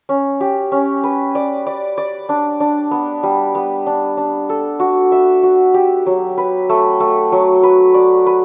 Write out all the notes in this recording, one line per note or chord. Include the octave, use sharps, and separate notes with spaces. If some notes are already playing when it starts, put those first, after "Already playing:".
C#4
G4
C#4
B4
D5
D5
D5
D4
D4
B3
G3
B3
D4
D4
A4
F#4
E5
F#4
G4
F#3
B4
A3
A3
F#3
B4
D5
B4